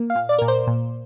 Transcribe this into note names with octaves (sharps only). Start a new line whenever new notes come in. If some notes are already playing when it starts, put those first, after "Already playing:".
Already playing: A#3
F5
A#2
D5
A#2 A#4
C5
A#2